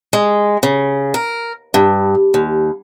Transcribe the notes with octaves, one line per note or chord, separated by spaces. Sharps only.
G#3
C#3
A#4
G2
D#2